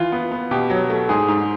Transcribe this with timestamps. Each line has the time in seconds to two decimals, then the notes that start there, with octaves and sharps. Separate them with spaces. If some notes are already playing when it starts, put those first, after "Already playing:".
Already playing: E3 F4
0.12 B3
0.31 B3
0.51 B2 G4
0.70 F#3
0.90 A3
1.09 G#2 G#4
1.28 G#2